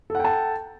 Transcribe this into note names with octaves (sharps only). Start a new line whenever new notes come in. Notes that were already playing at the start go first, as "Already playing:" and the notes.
A4 F#5 G5 A5